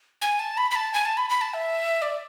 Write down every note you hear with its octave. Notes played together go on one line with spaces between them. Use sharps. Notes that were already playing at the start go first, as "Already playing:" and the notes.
G#5
A5
B5
B5
A5
G#5
A5
B5
B5
A5
E5
D5